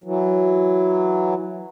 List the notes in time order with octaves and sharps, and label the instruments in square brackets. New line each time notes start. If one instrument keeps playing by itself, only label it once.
[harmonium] E3 F#3